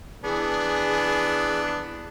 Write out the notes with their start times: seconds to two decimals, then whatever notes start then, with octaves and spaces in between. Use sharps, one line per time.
0.24 E3 B3 D4 G#4